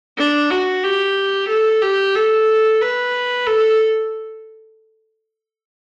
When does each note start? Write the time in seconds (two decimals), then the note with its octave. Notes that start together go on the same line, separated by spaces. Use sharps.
0.18 D4
0.51 F#4
0.83 G4
1.49 A4
1.82 G4
2.15 A4
2.82 B4
3.46 A4